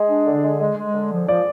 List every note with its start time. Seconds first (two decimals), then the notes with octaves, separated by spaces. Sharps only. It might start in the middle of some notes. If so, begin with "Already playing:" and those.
Already playing: G#3 G#4
0.09 D4
0.26 D3
0.44 G#3
0.60 G#3
0.77 G#3
0.94 D3
1.12 F3
1.28 F3 D5